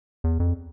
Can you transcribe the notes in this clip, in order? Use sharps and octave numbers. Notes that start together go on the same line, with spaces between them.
E2
F2